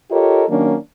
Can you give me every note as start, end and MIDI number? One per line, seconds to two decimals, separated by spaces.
0.11 0.45 65
0.11 0.45 67
0.11 0.45 69
0.11 0.45 70
0.11 0.45 73
0.11 0.45 75
0.49 0.75 51
0.49 0.75 54
0.49 0.75 58
0.49 0.75 61
0.49 0.75 62